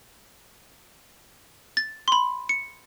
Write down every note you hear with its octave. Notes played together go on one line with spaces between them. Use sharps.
A6
B5 C6
C#7